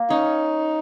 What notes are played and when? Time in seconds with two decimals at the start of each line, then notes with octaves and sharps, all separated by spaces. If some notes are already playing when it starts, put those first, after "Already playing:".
Already playing: A#3
0.10 C#4 D#4